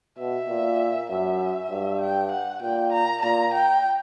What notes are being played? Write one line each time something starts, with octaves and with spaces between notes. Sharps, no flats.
B2 E5
A#2
F#2 E5
G2
G5
F#5
A#2 G5
A#5
A#2 A#5
G5